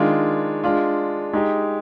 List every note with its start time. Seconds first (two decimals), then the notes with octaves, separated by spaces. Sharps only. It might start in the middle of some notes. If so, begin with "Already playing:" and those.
Already playing: D#3 G#3 D4 F4
0.64 G#3 D4 F4
1.33 G#3 D#4 G4